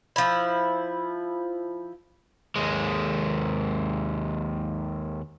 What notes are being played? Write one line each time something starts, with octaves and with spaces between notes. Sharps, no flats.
F3 E4
D#2 G#3